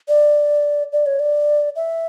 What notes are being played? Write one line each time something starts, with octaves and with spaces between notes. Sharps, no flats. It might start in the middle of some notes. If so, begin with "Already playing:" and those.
D5
D5
C#5
D5
E5